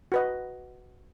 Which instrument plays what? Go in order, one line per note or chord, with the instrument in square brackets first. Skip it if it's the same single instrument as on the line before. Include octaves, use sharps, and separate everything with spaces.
[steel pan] F#4 B4 D#5